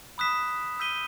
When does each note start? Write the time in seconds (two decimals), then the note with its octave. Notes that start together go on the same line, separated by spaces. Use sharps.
0.18 B5 D#6 F#6 B6 E7
0.80 E6 G6 B6 D#7 G7